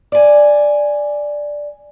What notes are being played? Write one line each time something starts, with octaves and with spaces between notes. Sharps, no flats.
D5 G#5